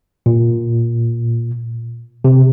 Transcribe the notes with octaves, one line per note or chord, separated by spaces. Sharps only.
A#2
C3